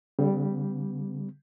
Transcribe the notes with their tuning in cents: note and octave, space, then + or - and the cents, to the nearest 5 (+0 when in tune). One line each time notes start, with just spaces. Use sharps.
D3 -45 G3 +0 B3 +35